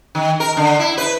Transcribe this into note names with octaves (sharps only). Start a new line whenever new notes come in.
D#3
A#4
D3
E4
B4